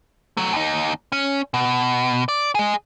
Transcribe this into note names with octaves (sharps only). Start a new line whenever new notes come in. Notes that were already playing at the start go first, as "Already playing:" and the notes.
F#3 A3
D#2 D#4
C#4
B2
D5
G#4 D#5